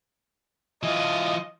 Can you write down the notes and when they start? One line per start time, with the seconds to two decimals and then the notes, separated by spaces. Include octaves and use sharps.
0.83 E3 F4 D#5